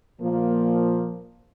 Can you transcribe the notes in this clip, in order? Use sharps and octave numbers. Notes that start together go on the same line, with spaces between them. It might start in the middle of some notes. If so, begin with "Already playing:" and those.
A#2 F3 A#3